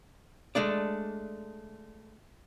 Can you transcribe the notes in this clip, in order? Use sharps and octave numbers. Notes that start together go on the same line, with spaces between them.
G#3 A3 D4 D5